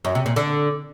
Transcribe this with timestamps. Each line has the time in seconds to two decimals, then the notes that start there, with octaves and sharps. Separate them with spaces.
0.05 F#2
0.15 C3
0.26 A#2
0.36 D3